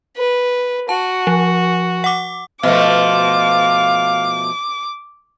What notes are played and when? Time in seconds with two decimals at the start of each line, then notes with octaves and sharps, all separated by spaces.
0.17 B4
0.89 F#4 A5
1.27 F3
2.04 F#5 D6
2.63 B2 F3 A3 F5 D6